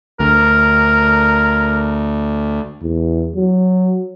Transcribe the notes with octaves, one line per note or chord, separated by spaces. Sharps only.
D2 A#4
E2
F#3